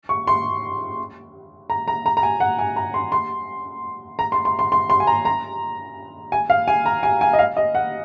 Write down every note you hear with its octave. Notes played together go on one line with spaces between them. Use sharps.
C#6
C6
A#5
A#5
A#5
A#5
G#5
F#5
G#5
A#5
C6
C6
A#5
C6
C6
C6
C6
C6
G#5
A#5
A#5
G#5
F5
G#5
A#5
G#5
G#5
D#5
F5
D#5
F#5